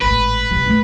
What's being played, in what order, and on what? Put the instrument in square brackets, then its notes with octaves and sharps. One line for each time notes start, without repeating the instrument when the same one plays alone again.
[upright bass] G#1 A2 [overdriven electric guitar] B4
[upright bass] B2 G3
D1 A3